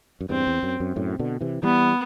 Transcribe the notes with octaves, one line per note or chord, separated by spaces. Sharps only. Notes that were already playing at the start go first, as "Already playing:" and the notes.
F#2
E2 G2 C4
E2
F#2
F#2
F#2 A2
B2 D3
C3 E3
E3 G3 B3